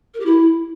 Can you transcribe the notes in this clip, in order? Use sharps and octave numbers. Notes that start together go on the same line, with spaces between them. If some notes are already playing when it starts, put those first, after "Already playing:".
A#4
G4
E4